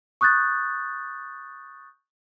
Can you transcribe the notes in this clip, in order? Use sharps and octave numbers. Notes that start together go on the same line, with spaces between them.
C#6 D#6 F#6 G6 A6